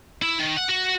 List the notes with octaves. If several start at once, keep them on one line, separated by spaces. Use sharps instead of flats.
E4
D#3
F#5
F#4